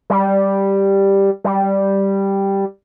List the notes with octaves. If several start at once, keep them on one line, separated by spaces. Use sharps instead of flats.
G3
G3